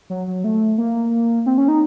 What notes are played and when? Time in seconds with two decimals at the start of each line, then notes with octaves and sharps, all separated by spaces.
0.10 F#3
0.27 F#3
0.44 A3
0.78 A#3
1.46 C4
1.58 C#4
1.68 D#4